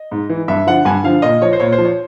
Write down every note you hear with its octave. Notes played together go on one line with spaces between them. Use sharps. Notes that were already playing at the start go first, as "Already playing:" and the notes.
Already playing: D#5
G#2
E3
G2 E5
D3 F3 F#5
G2 G#5
D3 F3 F5
A#2 D#5
F3 C#5
C5
A#2 C#5
C5
F3
C#5